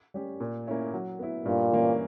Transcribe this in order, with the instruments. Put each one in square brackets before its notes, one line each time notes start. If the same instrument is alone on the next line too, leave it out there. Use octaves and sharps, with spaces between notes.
[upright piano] G3 C#4 G4
A#2
A#3 C#4 E4
F#3
B3 E4
[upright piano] G2 [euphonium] A#2
[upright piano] E3 A#3 C#4